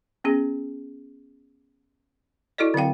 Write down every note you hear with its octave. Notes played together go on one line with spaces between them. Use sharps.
B3 C#4 G#4
E4 F#4 A4 D5 D#5
D3 F#3 C4 F5 G5